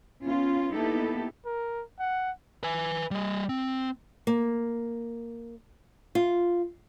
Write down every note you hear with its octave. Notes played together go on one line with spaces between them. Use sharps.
B3 C#4 F4
A#3 B3 D#4 E4 G4 A4
A#4
F#5
B4 G#5
G3 D#5
C4
A#3
F4